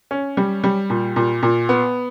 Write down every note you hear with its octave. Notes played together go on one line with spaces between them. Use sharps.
C#4
G3
G3
A#2
A#2
A#2
B3